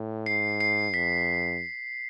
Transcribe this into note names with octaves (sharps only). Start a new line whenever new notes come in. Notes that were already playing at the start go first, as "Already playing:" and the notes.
Already playing: A2
G#2 C7
C7
F2 B6